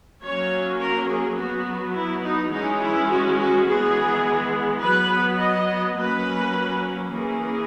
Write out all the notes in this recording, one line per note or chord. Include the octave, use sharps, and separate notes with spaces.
F#3 A#3 C#4 C#5
A#4
G#4
F#3 B3 F#4
E4
D#4
E3 G#3 C#4 D#4
E4
F#4
F#4
E3 G#3 B3 G#4
F#3 B3 B4
D#5
F#3 A#3 C#4 B4
E3 A#3 C#4 G#4